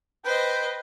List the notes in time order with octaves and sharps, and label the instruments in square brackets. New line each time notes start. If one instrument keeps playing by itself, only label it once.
[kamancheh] B4 [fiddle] C5 D#5 [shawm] G5